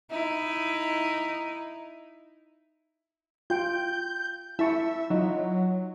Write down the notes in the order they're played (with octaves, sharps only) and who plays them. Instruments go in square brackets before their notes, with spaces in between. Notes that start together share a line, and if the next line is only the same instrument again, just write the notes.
[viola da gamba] D#4 E4
[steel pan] F4 G5 [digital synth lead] G6
[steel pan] E4 A5 C#6 [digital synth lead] E5
[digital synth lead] F#3 [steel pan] D#4 F4